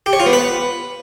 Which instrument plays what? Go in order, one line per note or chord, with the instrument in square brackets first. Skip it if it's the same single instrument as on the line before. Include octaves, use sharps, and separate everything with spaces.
[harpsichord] G4
C#5
F4
B3
B4